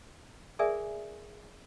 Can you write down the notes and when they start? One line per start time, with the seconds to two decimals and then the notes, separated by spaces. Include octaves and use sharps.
0.59 G#4 A#4 D5 E5 G#5 D#6